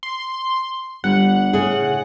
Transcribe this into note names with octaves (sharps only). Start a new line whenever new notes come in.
C6
G1 G3 F#5
A2 C#3 G#4